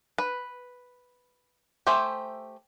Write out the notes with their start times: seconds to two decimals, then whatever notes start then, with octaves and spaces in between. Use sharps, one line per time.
0.18 B4
1.87 A3 G4 C5 E5 G#5